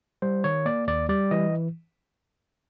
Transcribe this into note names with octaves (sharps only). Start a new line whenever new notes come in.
G3 C5
D#3 C#5
A#3 D5
D#2 D5
G3 D5
E3 D#5